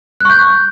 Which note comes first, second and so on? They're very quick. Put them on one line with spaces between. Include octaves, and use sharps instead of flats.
F#6 C#6 G6